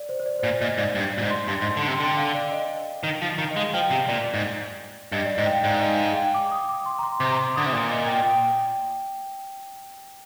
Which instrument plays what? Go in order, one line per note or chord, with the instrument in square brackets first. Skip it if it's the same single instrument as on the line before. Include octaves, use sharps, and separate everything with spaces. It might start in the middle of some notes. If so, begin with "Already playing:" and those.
Already playing: [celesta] D5
C5
C5
D5
C5
[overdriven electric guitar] A#2 [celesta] D5
[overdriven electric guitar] A#2 [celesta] D#5
[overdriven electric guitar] G#2 [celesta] D5
[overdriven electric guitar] G2
[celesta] D5
[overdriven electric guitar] A#2
G#2
[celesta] C6
[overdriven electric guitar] G2 [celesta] C6
[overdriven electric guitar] G#2
D3
[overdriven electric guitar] C3 [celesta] C6
[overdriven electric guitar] D3 [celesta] G5
[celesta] F5
D5
D#5
[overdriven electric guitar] D#3
F3
D#3
[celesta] D#5
[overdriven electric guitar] G#3 [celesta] F5
[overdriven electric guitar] F3 [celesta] G5
[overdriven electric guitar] C3
[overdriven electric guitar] A#2 [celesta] D5
[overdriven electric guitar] G#2
[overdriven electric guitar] G2 [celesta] D#5
[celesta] D5
[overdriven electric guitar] G#2 [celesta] D#5
[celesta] G5
F5
[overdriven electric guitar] G#2 [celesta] D5
[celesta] F5
D#5
F5
G5
D6
D#6
D6
C6
A#5
C6
[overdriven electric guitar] C3 [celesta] D6
[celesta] A#5
C6
[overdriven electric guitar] D3 [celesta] D#6
[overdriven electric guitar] C3
[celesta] D#6
[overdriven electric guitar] A#2 [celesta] D6
[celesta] D#5
G5
G5